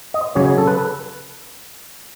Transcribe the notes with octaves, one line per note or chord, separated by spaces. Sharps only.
D#5
C#3 F#3 C#4 C#5
A4
B4